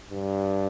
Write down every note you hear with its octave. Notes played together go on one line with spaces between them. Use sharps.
G2